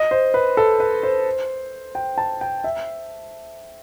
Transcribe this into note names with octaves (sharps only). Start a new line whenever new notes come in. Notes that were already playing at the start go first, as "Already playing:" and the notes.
Already playing: D#5
C5
B4
A4
B4
C5
G5
A5
G5
E5